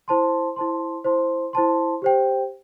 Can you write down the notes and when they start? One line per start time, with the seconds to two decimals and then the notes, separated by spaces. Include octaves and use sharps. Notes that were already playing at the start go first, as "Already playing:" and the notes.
0.08 E4 C5 A5 C6
0.56 E4 C5 A5 C6
1.05 E4 C5 A5 C6
1.53 E4 C5 A5 C6
2.02 G4 C5 G5